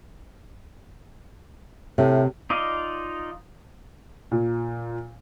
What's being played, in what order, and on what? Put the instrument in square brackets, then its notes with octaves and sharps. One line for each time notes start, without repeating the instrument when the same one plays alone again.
[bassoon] A2 [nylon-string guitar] C3
[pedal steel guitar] D#4 F4 D5 D#5 F5
[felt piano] A#2